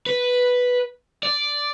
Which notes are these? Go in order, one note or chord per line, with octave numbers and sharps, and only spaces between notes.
B4
D5